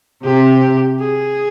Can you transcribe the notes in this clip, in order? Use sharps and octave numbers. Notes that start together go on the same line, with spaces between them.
C3 G4
G#4